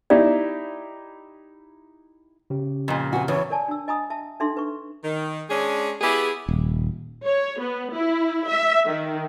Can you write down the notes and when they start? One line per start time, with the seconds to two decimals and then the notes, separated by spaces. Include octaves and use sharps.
0.10 D#4 E4 G4 D5
2.50 C#3 C#4 G4
2.88 F2 A#2
3.13 C4 F#4 G#5
3.28 E2 E3 C#5
3.50 A#4 D5 G#5 A5
3.68 D4 E6
3.88 D#5 G#5 A#5 B5 D#6
4.10 E5 A5
4.40 D4 D#4 A4 E5 C6
4.57 B4 C#6
5.03 D#3
5.49 G#3 C#4 D4 G#4
6.01 B3 E4 G4 G#4
6.49 D#1
7.26 C#5
7.61 B3
7.95 E4
8.48 E5
8.86 D#3